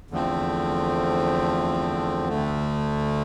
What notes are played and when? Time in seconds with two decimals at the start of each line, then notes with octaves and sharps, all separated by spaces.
0.11 E2 D3 F3 A3 C4
2.29 D2 D3 A3